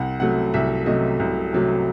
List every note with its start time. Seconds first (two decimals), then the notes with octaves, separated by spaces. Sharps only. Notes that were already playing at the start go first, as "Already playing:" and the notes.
Already playing: C2 F#5
0.20 C3 F#3 A3 F#5
0.54 C2 E5
0.86 C3 F#3 A3 D#5
1.20 C2
1.53 C3 F#3 A3